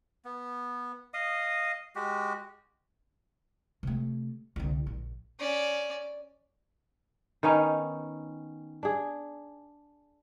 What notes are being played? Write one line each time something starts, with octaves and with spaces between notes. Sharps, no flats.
B3
D#5 F5 D#6
G#3 F#4 G4
C3 A3
C2 D3
A#1
C#4 D5
D#3 B3 C#4 D#4
D4 G#4